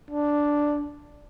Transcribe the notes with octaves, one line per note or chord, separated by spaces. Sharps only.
D4